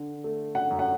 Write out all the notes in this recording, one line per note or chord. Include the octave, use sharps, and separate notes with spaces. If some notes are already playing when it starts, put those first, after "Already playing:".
Already playing: D3
A3
F#5
F#2
F#5